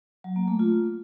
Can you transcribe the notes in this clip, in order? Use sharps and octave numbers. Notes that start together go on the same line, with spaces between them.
F#3
A#3
A3
F4